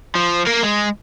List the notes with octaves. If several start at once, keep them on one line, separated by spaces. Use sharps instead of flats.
F3
A#3 A#4
G#3